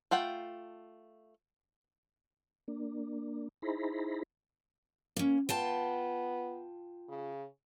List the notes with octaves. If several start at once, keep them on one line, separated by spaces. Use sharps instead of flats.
A3 F4 F#5 G5
A#3 D4
D#4 E4 G#4 C5 A#5 B5
A#3 C#4
B3 F4 G5 A5
C#3